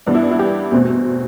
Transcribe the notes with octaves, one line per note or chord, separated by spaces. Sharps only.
G2 E3 B3 D4
E4
D4
E4
G4
E2 B2 A3 C4